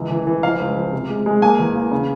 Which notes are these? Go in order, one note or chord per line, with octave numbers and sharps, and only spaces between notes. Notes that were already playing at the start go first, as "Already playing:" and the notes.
Already playing: C#2 E3
E3
E3
F3 F5
C#2
F3
C3
G#3
G#3
A#3 G#5
E2
A#3
C#3